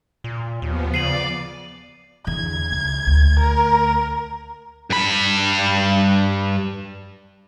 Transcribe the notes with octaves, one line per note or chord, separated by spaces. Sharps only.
A#2
D#2 F3 B3
C#3 D5 C7 D#7 F#7
E2 D3 G#6
C#2
D2
A#4
G2 B5